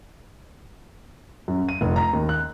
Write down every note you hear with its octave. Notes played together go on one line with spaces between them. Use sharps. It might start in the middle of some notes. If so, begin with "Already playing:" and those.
F#2
D#7
F1
A#5
D#2
F#6